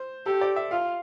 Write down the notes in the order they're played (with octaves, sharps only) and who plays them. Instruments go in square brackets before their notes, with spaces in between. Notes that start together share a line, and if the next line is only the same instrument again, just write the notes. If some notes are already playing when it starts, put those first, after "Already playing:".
Already playing: [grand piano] C5
[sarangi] G4 [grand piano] A4
[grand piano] D5
E5
[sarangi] F4 [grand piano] F5